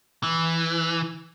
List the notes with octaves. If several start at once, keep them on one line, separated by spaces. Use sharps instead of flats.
E3